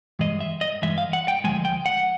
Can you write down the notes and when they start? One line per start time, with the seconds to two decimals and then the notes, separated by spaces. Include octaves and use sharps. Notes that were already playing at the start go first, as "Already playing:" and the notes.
0.19 G2 E3 G#3 D#5
0.40 E5
0.61 D#5
0.82 G2 E3 G#3 E5
0.98 F5
1.13 F#5
1.28 G5
1.44 D2 C3 F3 G#3 G#5
1.65 G5
1.86 F#5